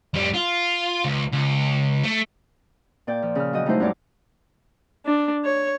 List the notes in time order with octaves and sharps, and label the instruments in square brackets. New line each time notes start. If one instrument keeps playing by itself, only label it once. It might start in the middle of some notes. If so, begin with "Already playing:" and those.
[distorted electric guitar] F2 G3
F4
C#2
C#2
A3
[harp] A#2 D5 G5
F3
C#3 F6
F#3 F#4 D#5 G5
F#3 G3 A3 D#4 E4 C5
F#2 A#2 G3 C#5 D5 D6
[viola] D4
C#5